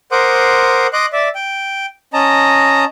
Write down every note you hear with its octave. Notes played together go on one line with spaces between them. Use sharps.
A#4 C5 F#5 C6 D6 D#6
D#5 C6 D6 F#6
D5 E5
G5
C#4 D#5 A5 A#5